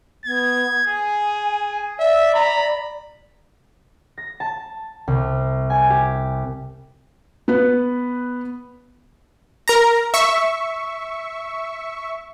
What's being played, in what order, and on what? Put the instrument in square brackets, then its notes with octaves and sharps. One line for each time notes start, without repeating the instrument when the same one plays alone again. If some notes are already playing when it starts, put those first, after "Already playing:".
[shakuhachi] B3 [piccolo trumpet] G#6
[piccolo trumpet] G#4 [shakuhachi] G#5
[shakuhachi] D5 [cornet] E5
[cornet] A#5 [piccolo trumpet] B5
[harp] A#6
A5
C2
G#5
G4
[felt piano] B3 B4
[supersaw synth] A#4 A#5
E5 C#6